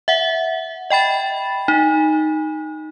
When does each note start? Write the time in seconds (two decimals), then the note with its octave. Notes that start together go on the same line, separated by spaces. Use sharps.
0.08 E5 F#5
0.90 D#5 G5 B5 A6
1.68 D#4